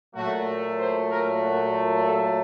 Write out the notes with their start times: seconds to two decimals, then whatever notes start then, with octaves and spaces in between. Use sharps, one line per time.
0.15 A#2 F#3 A3 F#4
0.78 C5
1.10 A#4
1.42 F#4
2.04 A4